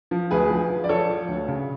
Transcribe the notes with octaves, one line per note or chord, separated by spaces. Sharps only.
F3
D2 G#4 B4
F3
F3
D5
F3 A4 C#5
F3
D2
C#3